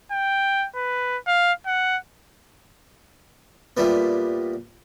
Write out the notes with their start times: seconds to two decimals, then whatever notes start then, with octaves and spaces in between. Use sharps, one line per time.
0.12 G5
0.76 B4
1.27 F5
1.66 F#5
3.77 A#2 G3 A3 B3